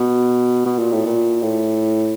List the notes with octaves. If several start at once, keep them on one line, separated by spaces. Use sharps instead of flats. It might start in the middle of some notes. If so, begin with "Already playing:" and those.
Already playing: B2
B2
A#2
A2
A#2
A2